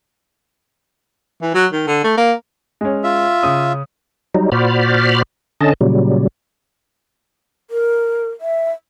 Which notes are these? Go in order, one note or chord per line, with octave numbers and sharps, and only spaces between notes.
E3
F#3
D#3
D3
A3
A#3
G#3 C#4
F4 E5
C#3 D#6
F#3 G3 D#4
A#2 F#4 C5 D5 B5 F6
D3 C#4 D#5 A5
A#2 C#3 F#3 G3
A#4
E5